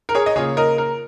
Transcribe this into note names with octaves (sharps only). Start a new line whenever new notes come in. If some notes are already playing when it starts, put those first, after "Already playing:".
A#4
G#4 C#5
D#5
C#3 A#3 F4 G#4 C#5
A#4 D#5
A#4